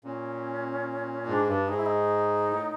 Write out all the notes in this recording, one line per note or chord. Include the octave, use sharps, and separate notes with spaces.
A#2 C#4
G#2 D4
G2 D4
G#2 D#4
E4
D#4
A2